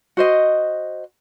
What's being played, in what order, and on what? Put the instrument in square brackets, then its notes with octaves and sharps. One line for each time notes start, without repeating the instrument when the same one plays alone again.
[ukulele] F#4 C5 D#5